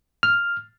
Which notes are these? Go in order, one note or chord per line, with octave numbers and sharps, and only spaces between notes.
F6